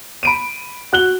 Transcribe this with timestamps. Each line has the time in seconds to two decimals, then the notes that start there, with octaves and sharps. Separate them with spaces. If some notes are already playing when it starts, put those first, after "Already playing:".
0.23 B5 D7 D#7
0.93 F#4 F#6 G7